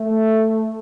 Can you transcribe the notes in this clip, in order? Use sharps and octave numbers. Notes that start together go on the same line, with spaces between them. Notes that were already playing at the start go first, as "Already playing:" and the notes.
Already playing: A3